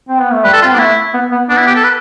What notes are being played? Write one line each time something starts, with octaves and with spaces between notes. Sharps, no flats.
C4
B3
A3
G3 B4
A4
C4 F4
B3 D4
A3 E4
B3
B3
B3 D4
E4
G4
A4
B4